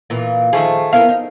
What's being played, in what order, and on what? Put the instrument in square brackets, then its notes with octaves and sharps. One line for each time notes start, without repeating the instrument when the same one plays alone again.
[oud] A#2 E3
[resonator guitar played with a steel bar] D#3 A3 G#4 [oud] F3
[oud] B3 E4 A#4 [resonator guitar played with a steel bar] F5
[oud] D#4